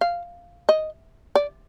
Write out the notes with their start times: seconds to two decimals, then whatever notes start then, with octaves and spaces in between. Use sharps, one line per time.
0.01 F5
0.69 D#5
1.35 D5